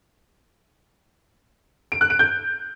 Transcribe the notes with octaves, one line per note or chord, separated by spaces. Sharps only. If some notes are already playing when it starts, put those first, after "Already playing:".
D7
F#6
D7
G6